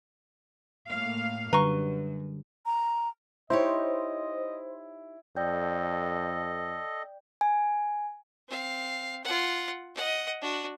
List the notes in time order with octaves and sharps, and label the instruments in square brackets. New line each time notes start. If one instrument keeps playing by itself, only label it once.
[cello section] A2 A#3 F5
[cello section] F#2 [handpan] D3 G3 [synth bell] B4 [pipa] A#5 C#6
[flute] A#5
[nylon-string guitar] D#4 G4 C#5 [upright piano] E4 [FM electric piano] C5 [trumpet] D#5
[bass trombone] F2 [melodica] A4 D#5 [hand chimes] D5 G5 G6
[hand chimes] G#5
[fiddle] C4 F5
F4 F#5
D#5 F#5
D4 F#4